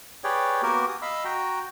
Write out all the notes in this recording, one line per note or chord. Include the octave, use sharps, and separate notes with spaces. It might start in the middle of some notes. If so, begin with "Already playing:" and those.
G4 G#4 B4 C#5 D5 G5
A#3 B3 F#4 G4 A#4
G#5 D#6
D#5 F5 B5 E6
F#4 G5 A#5